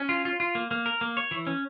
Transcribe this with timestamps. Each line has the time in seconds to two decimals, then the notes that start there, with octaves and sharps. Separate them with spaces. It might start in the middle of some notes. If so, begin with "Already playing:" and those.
Already playing: C#4
0.09 F4
0.25 F4
0.40 F4
0.55 A#3
0.71 A#3
0.86 A#4
1.01 A#3
1.17 C#5
1.31 E3
1.47 C#4